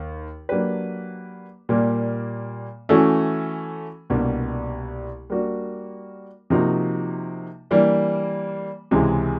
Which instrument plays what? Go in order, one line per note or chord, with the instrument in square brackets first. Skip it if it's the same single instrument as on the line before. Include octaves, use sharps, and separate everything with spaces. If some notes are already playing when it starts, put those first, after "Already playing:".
Already playing: [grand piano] D#2
F#3 A#3 D4 G4 B4
A#2 G3 A#3
E3 A3 C#4 F#4 A4
C2 B2 G3 A#3 D4
G3 A#3 D4 F#4 A#4
C3 F3 A#3 D#4 F#4
E3 G3 A#3 D4
C#2 C3 E3 G#3